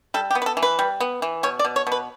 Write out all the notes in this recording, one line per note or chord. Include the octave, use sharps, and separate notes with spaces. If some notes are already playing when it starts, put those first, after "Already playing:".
G3 A4
G4
B3
B4
A4
E3
B4
G3
B3
E3
B2 C#5
D5
B2
C#5
B2
B4